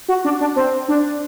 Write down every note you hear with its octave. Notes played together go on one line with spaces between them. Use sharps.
F#4
D4
D4
C4
D4